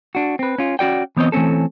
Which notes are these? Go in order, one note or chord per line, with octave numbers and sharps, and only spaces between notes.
D4 F#4
C4 B4
C#4 F4
C#4 F#4 D5 G5
E3 B3 C4 C#5 D#5
E3 A3 C4 C#4 A4